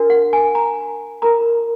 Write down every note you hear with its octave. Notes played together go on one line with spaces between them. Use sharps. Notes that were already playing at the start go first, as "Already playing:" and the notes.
Already playing: D4 F#4 A#4
F#5
G#5
A#5
F4 A#4 A#5